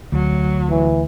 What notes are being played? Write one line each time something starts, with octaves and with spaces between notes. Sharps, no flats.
D2 F#3
E3